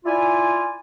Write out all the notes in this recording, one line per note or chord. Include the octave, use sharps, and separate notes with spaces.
E4 F4 D5 G#5